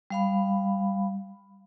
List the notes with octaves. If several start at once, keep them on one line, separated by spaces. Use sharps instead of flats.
G3 F5 B5